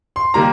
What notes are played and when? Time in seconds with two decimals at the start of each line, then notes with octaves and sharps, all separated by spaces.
0.16 C6
0.34 D#3 G3 A#3 A#5